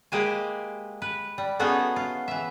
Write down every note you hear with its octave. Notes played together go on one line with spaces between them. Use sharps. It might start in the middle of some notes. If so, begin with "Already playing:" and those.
G#3 A#3 G4 B4 C5 G#5
B4
G3
A3 B3 C#4 D#4 F#4 G#4
F4
E3 E5